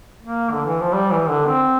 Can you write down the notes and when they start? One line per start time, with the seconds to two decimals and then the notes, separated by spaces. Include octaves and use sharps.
0.23 A#3
0.51 D3
0.66 E3
0.80 F3
0.93 G3
1.11 E3
1.28 D3
1.47 C4